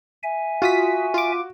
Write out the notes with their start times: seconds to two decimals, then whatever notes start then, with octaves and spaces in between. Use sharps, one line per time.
0.23 E5 G#5
0.62 F4 F#4 D#6 B6
1.14 F4 D6